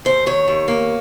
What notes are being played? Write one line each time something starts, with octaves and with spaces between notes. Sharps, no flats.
D#2 C5
D#3 C#5
D#2
A#3